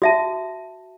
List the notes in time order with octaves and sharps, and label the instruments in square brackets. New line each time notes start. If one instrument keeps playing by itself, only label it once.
[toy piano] F#4 E5 A5